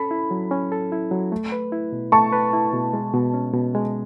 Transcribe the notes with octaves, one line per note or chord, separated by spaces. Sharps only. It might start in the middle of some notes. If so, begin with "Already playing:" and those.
Already playing: C#4 A4 B5
E4
F#3
C#4
A4
E4
F#3
A3
B4
E4
B2
A3 A5 C#6
B4
E4
B2
G#3
B2
C#4
B2
G#3